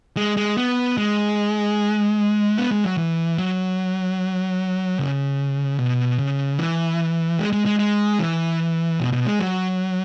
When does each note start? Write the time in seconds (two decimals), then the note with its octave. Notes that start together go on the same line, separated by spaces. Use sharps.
0.17 G#3
0.37 G#3
0.57 B3
0.97 G#3
2.58 B3
2.71 G#3
2.84 F#3
2.98 E3
3.38 F#3
4.99 C#3
5.79 B2
6.19 C#3
6.59 E3
7.39 G#3
7.53 G#3
7.66 G#3
7.79 G#3
8.19 E3
9.00 B2
9.13 B2
9.26 G#3
9.40 F#3